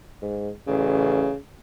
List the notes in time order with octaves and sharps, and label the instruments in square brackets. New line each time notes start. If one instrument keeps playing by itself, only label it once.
[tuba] G#2
[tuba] A1 [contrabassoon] C#3